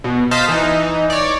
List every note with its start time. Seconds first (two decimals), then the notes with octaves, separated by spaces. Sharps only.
0.04 B2
0.31 C5 D#5 F5 A5 B6
0.48 E3 D#4
1.10 C#5 D5